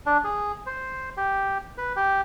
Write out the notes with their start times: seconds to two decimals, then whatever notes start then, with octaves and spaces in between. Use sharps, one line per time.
0.06 D4
0.24 G#4
0.66 C5
1.17 G4
1.78 B4
1.96 G4